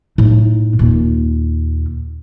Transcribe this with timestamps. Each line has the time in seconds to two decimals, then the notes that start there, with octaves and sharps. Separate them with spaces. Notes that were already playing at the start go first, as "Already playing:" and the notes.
0.18 A2 D#4
0.79 D#2 A#2